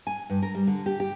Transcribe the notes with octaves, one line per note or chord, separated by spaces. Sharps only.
G#5
G2
A#4
G3
D3
G4
G4